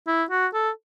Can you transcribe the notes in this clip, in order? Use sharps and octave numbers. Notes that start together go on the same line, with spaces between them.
E4
F#4
A4